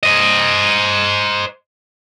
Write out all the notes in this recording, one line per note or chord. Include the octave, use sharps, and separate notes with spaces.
C5 D#5